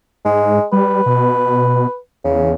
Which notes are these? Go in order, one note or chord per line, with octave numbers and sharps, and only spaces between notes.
G#2 G#3
G3 B4
B2
E2 C#3